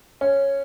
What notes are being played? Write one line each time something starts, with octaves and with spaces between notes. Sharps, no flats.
C#4